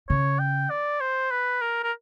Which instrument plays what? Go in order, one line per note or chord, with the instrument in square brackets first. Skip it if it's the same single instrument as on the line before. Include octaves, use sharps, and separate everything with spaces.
[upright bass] C#3 [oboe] C#5
[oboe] G5
D5
C5
B4
A#4
A#4